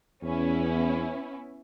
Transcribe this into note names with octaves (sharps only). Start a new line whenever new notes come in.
E2 B3 C#4 E4